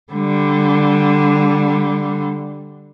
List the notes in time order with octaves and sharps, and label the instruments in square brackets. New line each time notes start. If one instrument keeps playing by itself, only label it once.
[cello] D3 G3